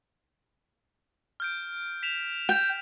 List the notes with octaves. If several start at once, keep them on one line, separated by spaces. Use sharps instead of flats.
F6 G6 D7
B6 E7 F7
G5